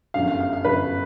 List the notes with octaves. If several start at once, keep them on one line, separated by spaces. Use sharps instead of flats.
G1 F#2 D3 F5
F5
F5
F5
G1 F#2 D3 B4